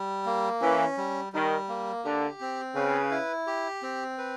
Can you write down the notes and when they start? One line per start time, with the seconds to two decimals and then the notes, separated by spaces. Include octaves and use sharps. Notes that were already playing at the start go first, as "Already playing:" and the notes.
Already playing: G3
0.26 A#3
0.62 E3 C#4
0.97 G3
1.33 D#3 G3
1.68 A#3
2.04 D3 G4
2.41 C4
2.75 C#3 B4
3.11 E4
3.47 G4
3.82 C4
4.18 B4